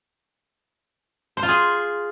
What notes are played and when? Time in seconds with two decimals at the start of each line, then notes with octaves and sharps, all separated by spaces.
1.37 C5
1.43 F4
1.49 G#4